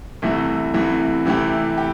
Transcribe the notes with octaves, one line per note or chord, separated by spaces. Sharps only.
C2 C3 E3 A3
C2 C3 E3 A3
C3 E3 A3 E4 G4
G4